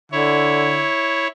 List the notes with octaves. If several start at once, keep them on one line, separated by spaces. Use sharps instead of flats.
D3 E4 C#5